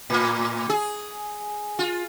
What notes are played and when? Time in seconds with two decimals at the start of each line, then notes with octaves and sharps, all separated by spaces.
0.10 A2
0.70 G#4
1.79 F4